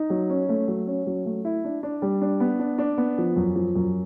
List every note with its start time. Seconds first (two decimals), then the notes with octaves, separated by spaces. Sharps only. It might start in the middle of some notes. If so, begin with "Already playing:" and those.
Already playing: D#4
0.10 F#3
0.30 C#4
0.49 A3
0.68 F#3
0.87 C#4
1.07 F#3
1.25 A3
1.45 E4
1.65 D4
1.83 D4
2.02 G3
2.21 D4
2.40 B3
2.59 D4
2.78 D4
2.98 B3
3.18 F3
3.36 F#2
3.56 F3
3.76 F#2